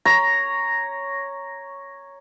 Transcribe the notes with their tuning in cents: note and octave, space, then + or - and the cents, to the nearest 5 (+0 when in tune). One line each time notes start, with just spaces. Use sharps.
C#5 +0 A#5 +0